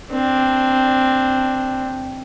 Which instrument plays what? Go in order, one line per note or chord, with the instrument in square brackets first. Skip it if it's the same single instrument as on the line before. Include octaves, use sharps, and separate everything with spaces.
[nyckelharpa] C4 D4